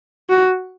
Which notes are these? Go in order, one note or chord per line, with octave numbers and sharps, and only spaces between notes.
F#4